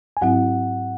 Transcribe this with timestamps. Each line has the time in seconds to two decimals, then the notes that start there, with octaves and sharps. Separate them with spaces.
0.17 G#5
0.22 G#2 F#3 C4 E4 F#5